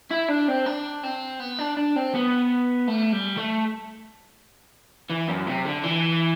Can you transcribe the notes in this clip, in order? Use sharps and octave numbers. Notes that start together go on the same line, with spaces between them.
E4
D4
C4
D4
C4
B3
D4
D4
C4
B3
A3
G3
A3
E3
F#2
C3
D3
E3